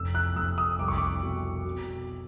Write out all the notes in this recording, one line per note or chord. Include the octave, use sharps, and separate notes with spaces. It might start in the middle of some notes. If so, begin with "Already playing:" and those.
Already playing: F1 E6
F#6
F1 E6
D#6
C2 D6
C#6
D6
B2
B2